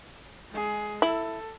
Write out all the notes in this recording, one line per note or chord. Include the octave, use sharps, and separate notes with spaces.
G#3 G#4
E4 A4